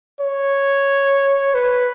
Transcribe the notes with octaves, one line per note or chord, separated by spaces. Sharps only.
C#5
B4